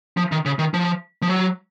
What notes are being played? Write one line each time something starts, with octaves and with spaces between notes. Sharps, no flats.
F3
D#3
C#3
D#3
F3
F3
F#3